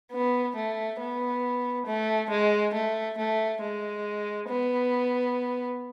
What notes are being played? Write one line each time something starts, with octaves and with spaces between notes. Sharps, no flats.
B3
A3
B3
A3
G#3
A3
A3
G#3
B3